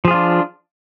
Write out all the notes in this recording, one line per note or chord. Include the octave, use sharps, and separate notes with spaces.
F3 D4 F4 G#4